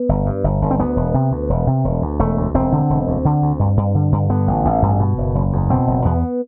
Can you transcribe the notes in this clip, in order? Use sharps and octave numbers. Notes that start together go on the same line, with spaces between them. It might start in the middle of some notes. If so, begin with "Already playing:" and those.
Already playing: B3
G1
G2
G1
G1
C4
D2 B3
E1
C3
D2
E1
C3
E1
D2
E1 A3
D2
E1 C4
D3
E1
D2
D3
D2
G2
G2
D3
G2
D3 B3
A1
A1
G2
B2
F#1
F#1
E2
B2 C4
F#1
E2 B3